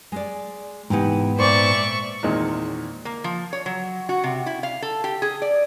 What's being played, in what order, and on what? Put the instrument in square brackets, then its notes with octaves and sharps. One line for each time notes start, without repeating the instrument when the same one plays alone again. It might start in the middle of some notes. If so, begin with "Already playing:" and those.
[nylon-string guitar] G#3 D5
[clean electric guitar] G#2 B3 [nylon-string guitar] C3 E3 D#4
[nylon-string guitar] A#2 C5 [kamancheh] D5 [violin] E5 C#6
[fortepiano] E2 A#2 D#3 G#3 C4 D#4
[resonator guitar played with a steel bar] A#3
F3
C#5
F#3
F#4
C3
E4
F5
A4
G4
G#4
D5